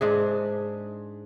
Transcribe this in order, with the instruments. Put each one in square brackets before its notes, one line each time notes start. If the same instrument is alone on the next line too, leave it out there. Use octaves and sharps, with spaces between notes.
[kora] G#2 D4 G#4